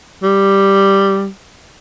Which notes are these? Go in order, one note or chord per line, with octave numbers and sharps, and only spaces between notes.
G3